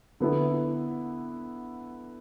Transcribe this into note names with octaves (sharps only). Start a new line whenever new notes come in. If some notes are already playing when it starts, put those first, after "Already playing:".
D3 B3 E4